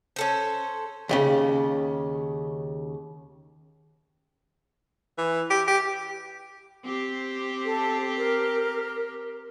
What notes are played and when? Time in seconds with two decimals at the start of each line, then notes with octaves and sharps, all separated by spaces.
0.16 C#4 A4 C5
1.09 D#2 A2 C#3
5.18 E3
5.50 G4
5.68 G4
6.85 C4 G4
7.65 A4
8.18 A#4